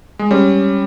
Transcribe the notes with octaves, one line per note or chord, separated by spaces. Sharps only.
G#3
G3 C#4